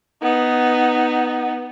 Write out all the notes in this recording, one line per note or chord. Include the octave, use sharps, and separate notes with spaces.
B3 D#4